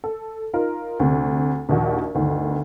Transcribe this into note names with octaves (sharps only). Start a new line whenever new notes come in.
A4
D#4 F4 A#4
D2 C3
A#1 D#2 F#4
G1 D2 D#3